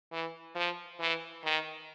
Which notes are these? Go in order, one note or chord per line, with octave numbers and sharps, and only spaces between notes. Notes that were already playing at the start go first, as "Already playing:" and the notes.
E3
F3
E3
D#3